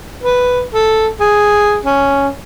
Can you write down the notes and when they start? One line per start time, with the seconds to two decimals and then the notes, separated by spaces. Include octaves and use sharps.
0.23 B4
0.74 A4
1.20 G#4
1.85 C#4